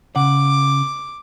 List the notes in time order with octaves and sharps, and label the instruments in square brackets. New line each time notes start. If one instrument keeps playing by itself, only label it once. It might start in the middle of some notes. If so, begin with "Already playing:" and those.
[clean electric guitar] C#3 F#5 [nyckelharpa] D6